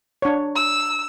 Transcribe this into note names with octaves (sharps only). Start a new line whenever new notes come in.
D4 C#5
E6